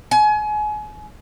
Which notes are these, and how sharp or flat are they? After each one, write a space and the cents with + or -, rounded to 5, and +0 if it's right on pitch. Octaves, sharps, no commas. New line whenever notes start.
G#5 +30